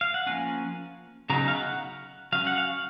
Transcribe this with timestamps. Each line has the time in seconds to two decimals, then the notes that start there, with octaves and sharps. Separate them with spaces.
0.01 F5
0.14 F#5
0.26 F3 A#3 C#4 G#5
1.30 C#3 F#3 B3 D#4 A#5
1.48 F5
1.55 F#5
2.32 F#3 C#4 F5
2.47 F#5
2.58 F5